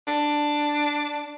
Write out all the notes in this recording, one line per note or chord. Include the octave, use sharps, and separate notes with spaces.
D4